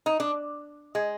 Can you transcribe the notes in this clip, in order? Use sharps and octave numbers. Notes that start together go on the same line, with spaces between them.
D#4
D4
G#3